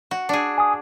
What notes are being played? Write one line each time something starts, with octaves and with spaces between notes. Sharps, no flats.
F#4
D4 G#4
G#5 D#6